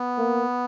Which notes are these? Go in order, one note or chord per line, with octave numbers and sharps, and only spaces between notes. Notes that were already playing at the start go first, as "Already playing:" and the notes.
Already playing: B3
A#3